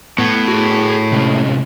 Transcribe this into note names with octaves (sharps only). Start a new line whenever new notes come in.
A2 B3
F#4 G#4
C3 G#3 C#4